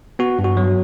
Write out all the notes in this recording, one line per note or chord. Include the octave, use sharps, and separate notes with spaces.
B3 F#4
G2
F#4
F#3